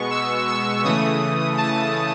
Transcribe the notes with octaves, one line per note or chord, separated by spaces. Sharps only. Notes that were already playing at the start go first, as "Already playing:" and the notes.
Already playing: B2 G#3 B3 C#6
E6
E6
C#3 E3 A3 D#6
A5